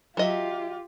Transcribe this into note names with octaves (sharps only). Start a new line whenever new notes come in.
F#3 F4 G4 D#5 E5